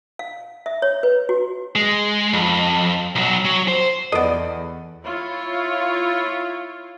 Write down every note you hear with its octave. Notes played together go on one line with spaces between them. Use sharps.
F5
E5
C#5
B4
F#4
G#3
F2
B1 F#3
F#3
C5
E2 A4 B4 D5 D#5 F#5
E4 F4 C#5